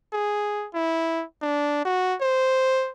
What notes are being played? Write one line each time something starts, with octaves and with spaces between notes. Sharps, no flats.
G#4
E4
D4
F#4
C5